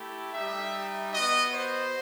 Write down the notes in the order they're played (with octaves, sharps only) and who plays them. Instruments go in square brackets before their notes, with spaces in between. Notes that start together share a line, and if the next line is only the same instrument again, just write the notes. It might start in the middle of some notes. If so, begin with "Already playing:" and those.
Already playing: [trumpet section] A3 E4 G4
G3 D#4 G4 E5
B3 F#4 D#5
C5